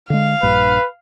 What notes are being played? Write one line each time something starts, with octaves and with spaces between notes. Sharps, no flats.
D3 G#3 F5
A#1 G2 B4